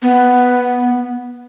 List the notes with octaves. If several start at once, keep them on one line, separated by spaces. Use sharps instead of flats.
B3